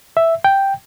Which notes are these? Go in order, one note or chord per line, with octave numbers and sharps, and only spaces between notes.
E5
G5